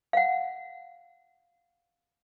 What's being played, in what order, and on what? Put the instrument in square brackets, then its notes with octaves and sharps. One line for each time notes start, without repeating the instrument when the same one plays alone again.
[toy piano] F5 F#5